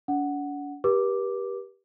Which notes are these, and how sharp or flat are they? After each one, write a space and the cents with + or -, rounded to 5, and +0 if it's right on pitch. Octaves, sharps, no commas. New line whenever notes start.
D4 -45 F#5 +0
G4 +0 B4 -45 D6 +0